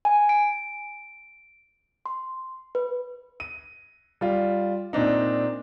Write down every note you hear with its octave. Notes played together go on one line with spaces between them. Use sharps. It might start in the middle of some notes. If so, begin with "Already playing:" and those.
G#5
D7
C6
B4
D#7
G3 F4
A#2 C4 D4 D#4